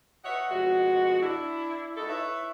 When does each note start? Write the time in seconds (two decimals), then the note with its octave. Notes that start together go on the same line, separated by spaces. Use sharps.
0.25 B4 C#5 D#5 E5 F#5
0.50 F2 B2 G#3 F#4
1.22 D4 E4
1.96 D#4 E4 F#4 A4
2.08 E4 B4 C#5 E5